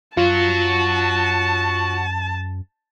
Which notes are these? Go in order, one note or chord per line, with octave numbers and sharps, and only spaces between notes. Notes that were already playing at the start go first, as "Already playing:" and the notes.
F#2 F4 F#4 C#5 A5